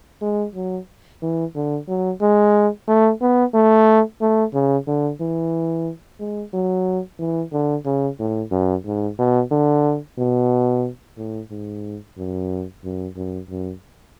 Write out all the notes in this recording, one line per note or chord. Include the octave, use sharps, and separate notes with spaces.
G#3
F#3
E3
D3
F#3
G#3
A3
B3
A3
A3
C#3
D3
E3
G#3
F#3
E3
D3
C#3
A2
F#2
G#2
B2
D3
B2
A2
G#2
F#2
F#2
F#2
F#2